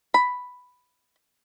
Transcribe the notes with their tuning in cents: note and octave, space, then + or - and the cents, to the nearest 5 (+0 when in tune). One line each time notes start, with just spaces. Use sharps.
B5 +5